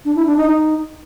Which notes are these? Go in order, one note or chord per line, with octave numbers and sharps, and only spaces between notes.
D4
E4
D4
D#4
D#4